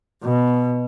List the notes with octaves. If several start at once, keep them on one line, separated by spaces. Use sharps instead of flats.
B2